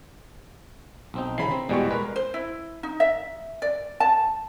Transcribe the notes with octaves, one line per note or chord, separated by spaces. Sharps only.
B1 C4 D#4
C#3 E3 A#5 B5 C7
C4
E2 B2 G3 G#3 E4 C#6
G#3 A#4 B4
C5
E4
D#4
E5
D5
A5